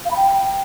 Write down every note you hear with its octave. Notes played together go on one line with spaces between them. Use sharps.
F5
B5
G5